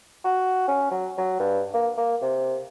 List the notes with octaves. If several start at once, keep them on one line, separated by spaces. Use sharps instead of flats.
F#4
C#4
F#3
F#3
G2
A#3
A#3
C3